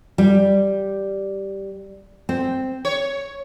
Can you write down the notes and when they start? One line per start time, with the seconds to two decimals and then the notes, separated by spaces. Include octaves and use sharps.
0.18 G3
2.29 C4
2.85 C#5